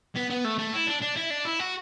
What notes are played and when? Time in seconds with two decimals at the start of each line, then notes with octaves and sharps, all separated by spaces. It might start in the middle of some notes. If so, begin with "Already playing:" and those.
0.16 B3
0.30 B3
0.44 A3
0.59 A3
0.73 E4
0.87 D4
1.02 D4
1.16 E4
1.30 D4
1.45 E4
1.60 F#4